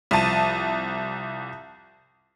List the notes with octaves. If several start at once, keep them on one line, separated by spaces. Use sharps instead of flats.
C2 F3 A5 D#7